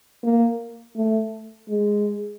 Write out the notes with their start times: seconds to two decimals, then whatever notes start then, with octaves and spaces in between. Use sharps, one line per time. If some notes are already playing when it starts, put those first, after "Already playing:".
0.23 A#3
0.96 A3
1.69 G#3